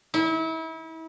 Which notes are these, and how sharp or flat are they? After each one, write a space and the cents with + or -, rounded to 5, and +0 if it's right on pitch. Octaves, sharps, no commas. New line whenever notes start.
E4 -35